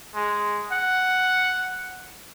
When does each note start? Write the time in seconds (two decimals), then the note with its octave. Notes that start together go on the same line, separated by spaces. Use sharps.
0.15 G#3
0.72 F#5